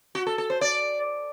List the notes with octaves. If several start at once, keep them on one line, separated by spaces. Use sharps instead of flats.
F#4
A4
A4
C5
D5